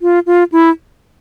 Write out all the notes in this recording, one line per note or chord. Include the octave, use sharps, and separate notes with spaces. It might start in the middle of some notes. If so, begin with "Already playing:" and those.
F4
F4
E4